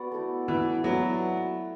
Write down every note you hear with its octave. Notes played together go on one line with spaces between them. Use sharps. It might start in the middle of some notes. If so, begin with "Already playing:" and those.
Already playing: B3 F#4 D5
A3 E4 A4
E3 E4 B4 D5
F#3 B3 E4 D5